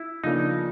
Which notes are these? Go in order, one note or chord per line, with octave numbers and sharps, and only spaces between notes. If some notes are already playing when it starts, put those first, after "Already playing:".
Already playing: E4
C#3 F3 A#3 D4 D#4